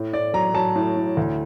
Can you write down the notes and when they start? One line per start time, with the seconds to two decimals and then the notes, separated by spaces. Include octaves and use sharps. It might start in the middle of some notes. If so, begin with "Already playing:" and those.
Already playing: A2
0.13 A2 D5
0.33 F#3 A#5
0.54 F#3 A5
0.75 A2
0.97 A2
1.17 D2